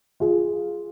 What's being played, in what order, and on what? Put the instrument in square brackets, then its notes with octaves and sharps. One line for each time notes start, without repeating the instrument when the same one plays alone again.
[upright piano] F4 G#4